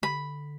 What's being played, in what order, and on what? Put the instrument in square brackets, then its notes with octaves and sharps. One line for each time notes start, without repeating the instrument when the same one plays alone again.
[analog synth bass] D3 [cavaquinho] B5